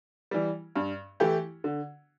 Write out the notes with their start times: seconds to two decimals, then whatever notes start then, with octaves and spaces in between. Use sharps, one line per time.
0.31 E3 G3
0.76 G2
1.20 E3 A3 E4 G4
1.64 D3